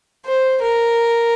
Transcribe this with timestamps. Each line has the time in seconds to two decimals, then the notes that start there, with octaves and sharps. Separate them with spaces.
0.26 C5
0.62 A#4